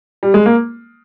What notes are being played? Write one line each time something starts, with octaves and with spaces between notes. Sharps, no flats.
G3
G#3
A#3